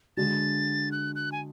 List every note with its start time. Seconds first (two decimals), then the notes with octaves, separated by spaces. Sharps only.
0.17 D3 G#3 D4 F#4 A6
0.92 F#6
1.15 F#6
1.32 G#5